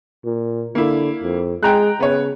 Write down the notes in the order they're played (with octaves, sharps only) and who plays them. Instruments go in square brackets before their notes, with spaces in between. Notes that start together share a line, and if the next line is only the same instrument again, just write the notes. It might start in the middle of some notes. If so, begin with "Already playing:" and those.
[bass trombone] A#2
[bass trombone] D3 [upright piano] A#3 E4
[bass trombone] F2
[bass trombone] G#3 [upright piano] G5 A#5 F#6
[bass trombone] C#3 [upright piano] B3 C#5